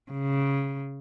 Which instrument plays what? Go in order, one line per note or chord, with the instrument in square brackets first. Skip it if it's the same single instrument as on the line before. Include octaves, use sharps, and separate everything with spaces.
[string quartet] C#3